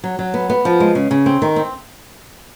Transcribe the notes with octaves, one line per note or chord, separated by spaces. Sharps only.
F#3
F#3
B3
B3
F3
G#3
C#3
C#3
C4
D#3
C4